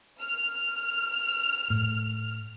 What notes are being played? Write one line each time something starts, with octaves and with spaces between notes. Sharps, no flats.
F6
A2